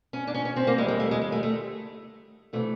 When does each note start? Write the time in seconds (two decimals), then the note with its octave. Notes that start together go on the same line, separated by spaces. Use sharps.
0.13 C#4
0.27 D4
0.34 C#4
0.45 C#4
0.56 C4
0.67 A#3
0.78 D#2 D3 G3 G#3
0.88 G#3
1.00 A3
1.11 G#3
1.22 G#3
1.32 A3
1.43 A3
2.53 C3 E3 A3